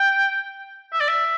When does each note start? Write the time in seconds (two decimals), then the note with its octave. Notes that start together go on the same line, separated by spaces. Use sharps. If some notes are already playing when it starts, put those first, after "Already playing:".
Already playing: G5
0.93 E5
1.00 D5
1.08 E5